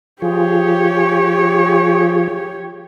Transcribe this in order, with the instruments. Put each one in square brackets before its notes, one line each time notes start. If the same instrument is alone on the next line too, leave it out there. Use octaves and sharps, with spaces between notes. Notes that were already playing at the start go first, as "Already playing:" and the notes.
[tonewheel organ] F3 F4 G#4 [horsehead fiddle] G4 C#5